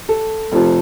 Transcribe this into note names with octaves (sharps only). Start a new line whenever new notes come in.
A4
F1 F2 C3 F3